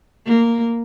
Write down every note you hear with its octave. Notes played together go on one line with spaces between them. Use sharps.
A#3